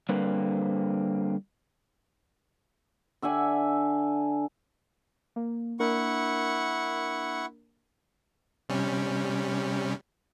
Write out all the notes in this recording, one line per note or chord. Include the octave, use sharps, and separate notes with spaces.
D3 G3 A#3 C4 B4 C5
D3 E5 F#5 G#5
A#3
A#3 D4 E4 A#4 F#5 C#6
C3 G3 C#4